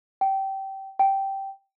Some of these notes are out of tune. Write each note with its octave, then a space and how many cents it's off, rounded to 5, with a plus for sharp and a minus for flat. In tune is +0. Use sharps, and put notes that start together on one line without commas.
G5 -20
G5 -10